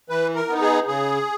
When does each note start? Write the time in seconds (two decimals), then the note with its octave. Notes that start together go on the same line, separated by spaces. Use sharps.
0.09 E3 B4
0.35 A#4
0.49 B3 D#4
0.61 G#4
0.87 C#3 G#4